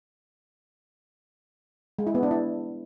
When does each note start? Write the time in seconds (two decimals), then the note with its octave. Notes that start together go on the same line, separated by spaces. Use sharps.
1.99 G#3
2.07 E4
2.15 B3
2.23 D4
2.31 E4